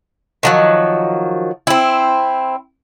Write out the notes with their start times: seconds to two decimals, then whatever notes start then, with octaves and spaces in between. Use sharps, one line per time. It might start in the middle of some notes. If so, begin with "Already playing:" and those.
0.43 D#3 F3 F#3
1.67 C4 E4